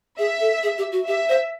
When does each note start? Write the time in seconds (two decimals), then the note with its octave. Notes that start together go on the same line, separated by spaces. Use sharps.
0.19 G#4 E5
0.40 A4
0.63 G#4
0.78 G4
0.92 F#4
1.07 G4 E5
1.29 C5